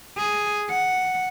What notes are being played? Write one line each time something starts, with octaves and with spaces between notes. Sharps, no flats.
G#4
F#5